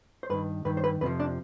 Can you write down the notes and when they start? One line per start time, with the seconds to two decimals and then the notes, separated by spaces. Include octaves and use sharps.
0.23 C5
0.30 G2 D#3 B4
0.65 G2 D#3 B4
0.77 C5
0.84 B4
1.01 F2 C3 F3 B4
1.20 D4